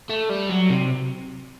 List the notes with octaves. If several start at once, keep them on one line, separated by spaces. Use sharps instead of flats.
A3
G3
F#3
C3